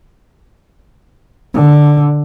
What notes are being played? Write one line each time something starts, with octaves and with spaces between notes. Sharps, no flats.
D3